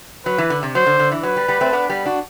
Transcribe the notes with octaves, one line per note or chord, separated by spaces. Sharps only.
F#3 B4
E3
D3
C3
F#3 C5
D3
D3
E3
F#3 B4
G3
G3 B3
A3 C4
B3 D4
G3 B3
D4 F#4